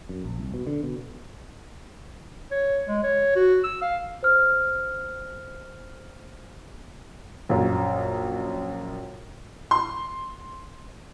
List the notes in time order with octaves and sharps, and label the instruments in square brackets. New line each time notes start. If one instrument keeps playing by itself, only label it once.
[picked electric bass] F#2
A#1
C2
B2
D3
B2
[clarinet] C#5
G#3
C#5
F#4
E6
F5
[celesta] C5 F6
[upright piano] A#1 F#2
C6